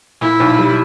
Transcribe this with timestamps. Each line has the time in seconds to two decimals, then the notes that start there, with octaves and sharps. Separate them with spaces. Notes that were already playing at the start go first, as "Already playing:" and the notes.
0.21 A#2 E4
0.40 B1
0.59 G3